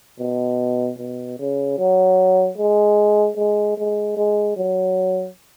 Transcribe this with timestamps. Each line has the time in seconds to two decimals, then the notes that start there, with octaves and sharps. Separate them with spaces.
0.20 B2
0.99 B2
1.39 C#3
1.78 F#3
2.58 G#3
3.37 G#3
3.77 G#3
4.17 G#3
4.57 F#3